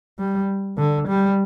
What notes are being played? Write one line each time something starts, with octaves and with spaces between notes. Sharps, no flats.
G3
D3
G3